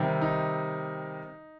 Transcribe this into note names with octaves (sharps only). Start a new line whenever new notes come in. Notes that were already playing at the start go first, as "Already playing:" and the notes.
Already playing: C3 D#3 G3 C4
D#4